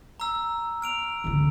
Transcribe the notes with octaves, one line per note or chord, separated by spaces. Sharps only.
A#5 E6
F6 D7 F7
D2 D#3